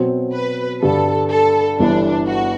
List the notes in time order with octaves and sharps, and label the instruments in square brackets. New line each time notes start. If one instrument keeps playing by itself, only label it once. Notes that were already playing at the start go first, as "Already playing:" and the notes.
Already playing: [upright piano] B2 F#3 C4
[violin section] B4
[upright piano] G2 D3 G3 [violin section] A4
[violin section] A4
[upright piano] G1 G2 E3 [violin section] D4
[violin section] F#4